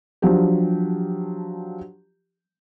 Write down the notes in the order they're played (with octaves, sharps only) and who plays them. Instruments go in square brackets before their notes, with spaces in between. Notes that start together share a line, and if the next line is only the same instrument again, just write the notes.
[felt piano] F3 F#3 D4 G4